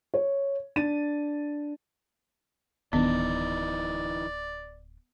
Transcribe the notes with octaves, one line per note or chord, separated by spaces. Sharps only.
C#5
D4 A6 D#7
D1 D#3 E3 B3 D4 D#4 D5